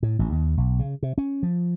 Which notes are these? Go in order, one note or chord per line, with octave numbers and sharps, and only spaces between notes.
A2
A1
D#2
B1
C#3
C3
C#4
F3